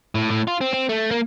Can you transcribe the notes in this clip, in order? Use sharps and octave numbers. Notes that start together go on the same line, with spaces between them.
A2
A2
F4
C4
C4
A3
A#3